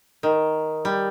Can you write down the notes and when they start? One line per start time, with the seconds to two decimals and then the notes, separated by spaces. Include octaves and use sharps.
0.23 D#3
0.85 G3